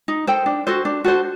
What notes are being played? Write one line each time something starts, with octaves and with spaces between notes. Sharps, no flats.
D#4
A4 C5 G5
D4
F#4 A4 C5
D4
F#4 A4 C5